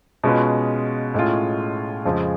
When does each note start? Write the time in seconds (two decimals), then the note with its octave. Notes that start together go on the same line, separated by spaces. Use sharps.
0.24 B2 G#3 C#4 F4 B4
1.14 A2 G#3 C#4 F4
2.05 F2 C#3 F3 G#3